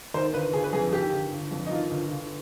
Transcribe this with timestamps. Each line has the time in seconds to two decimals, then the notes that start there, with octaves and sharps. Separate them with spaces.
0.14 D#3 C5
0.33 G1 B4
0.53 G1 G#4
0.64 B4
0.73 F2 G#4
0.93 D#3 G4
1.13 G1
1.32 G1
1.51 F2
1.66 D#4
1.71 D#3 F4
1.91 G1
2.10 G1